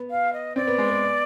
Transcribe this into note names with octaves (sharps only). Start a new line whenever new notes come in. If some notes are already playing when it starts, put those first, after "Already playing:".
Already playing: B3
F5
D#5
C4 D5
B3
G#3
B3